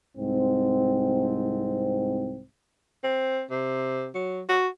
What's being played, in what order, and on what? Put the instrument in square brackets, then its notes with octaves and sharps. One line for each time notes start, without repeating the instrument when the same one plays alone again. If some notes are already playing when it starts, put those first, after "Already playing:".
[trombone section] C2 G#2 C4
[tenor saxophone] C4
C3
F#3
F#4